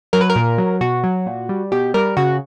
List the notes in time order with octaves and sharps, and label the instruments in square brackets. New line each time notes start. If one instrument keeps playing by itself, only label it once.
[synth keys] F#3 A#4
B4
A#4
A#2
F#3
B2 F#4
F#3
A#2
G3
B2 G4
G3 A#4
C#3 F#4